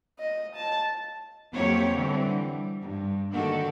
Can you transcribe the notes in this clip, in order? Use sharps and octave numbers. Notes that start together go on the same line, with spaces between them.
D#5
A5
F2 F#3 A#3 G4 C#5
D3 E3 G3 C4
G3
G2
D3 D#3 A#3 F#4 G4 A4